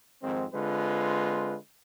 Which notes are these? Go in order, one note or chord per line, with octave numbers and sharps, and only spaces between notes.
F2 G#2 D#3 C4
D3 G#3 C4 F4 B4